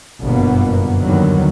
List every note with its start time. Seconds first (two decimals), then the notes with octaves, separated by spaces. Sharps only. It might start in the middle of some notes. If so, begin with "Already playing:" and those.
0.22 G1 F#2 B2 A#3 B3
0.99 D#2 D3 D#3 F#3 G3 B3